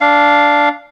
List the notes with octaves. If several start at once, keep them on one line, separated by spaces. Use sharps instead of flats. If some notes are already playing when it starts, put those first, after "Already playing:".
D4 F5